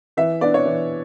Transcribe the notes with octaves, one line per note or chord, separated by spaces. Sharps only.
E3 E5
B3 D4 D5
C#5
E3